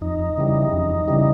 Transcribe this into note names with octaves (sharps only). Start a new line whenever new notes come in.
F2 D#4
C#3 E3 G3
F2
C#3 E3 G3